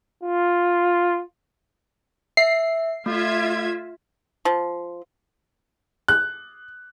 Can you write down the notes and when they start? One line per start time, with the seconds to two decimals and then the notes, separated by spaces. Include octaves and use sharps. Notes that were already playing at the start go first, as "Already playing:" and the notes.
0.23 F4
2.37 E5 C7
3.06 A3 F4 E5 G#6
4.45 F3
6.08 F#6